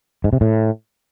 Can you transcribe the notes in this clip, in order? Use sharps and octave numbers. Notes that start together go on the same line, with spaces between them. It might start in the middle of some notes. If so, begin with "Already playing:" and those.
G#2
C3
A2